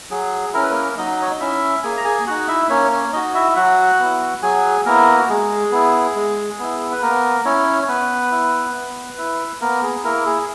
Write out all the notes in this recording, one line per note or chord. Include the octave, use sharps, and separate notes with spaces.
F#3 G#4
C#4 E4 A#4
B4
A#3 A#4
F#3 D#4 D#5
C#5
D#5
C#4 E4 E5
A#3 G#4 G#5
A#5
G#4 G#5
D#4 F#4 F#5
E4 E5
A#3 C#4 C#5
C#4 C#5
D#4 F#4 D#5
E4 E5
F#3 F#4 F#5
B3 E4
F#3 G#4 G#5
A#3 B3 E4 A#4
F#4
G#3 G#4
B3 E4
G#3
B3 E4
B4
A#3 B3 A#4
C#4 E4 C#5
C#5
B3 B4
E4
B3
E4
A#3 B3 A#4
G#4
A#3 E4 A#4
G#4